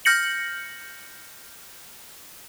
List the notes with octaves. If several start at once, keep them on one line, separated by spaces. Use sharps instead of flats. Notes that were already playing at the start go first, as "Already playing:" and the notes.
F6 G6 A#6 C#7 F#7